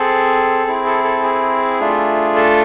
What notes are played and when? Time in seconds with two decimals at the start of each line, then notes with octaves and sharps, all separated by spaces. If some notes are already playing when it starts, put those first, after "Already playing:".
Already playing: C4 G#4 A4
0.67 C4 E4 G#4
0.86 A4
1.04 A4
1.24 G#4
1.80 A3 D4 F4
2.36 A4